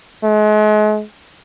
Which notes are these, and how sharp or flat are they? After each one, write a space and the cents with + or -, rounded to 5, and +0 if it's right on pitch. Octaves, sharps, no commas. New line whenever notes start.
G#3 +40